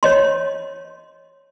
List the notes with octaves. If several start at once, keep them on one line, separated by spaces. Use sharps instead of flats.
C#5 D#5 C6